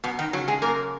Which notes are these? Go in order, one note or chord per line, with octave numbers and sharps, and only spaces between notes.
F#2 B2 B3
D#3 D#4
C#3 F#3 F#4
G#3 G#4
F#2 A#3 A#4